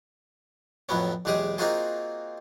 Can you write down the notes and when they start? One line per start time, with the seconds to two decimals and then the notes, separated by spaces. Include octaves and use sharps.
0.89 F2 A2 F#3 B3 C#4
1.25 B1 E2 G#3 G4 G#4 D#6
1.58 A#3 C4 D#4 F4 F#4 G#4